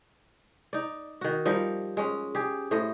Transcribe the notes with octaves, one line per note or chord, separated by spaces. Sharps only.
D#4 D5
D#3 F#4
F3 G3 D#4 A#4
G#3 C#4
G4 G#4
A2 A3 C5 D#5